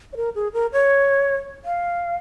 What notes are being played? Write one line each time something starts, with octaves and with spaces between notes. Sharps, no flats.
C#5
A#4
G#4
A#4
C#5
F5